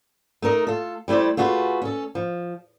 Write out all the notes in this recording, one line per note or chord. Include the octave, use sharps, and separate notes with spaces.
A3 D#4 A#4 D#5
F4 A4
G3 A3 E4 C5 D5
A3 F4 F#4 G#4 B4
C#4 A4
F3